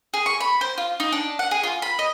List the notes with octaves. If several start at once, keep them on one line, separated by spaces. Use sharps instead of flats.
G#4
C#6
B5
C5
F4
D#4
D4
F#5
G#4
F4
B5
D#5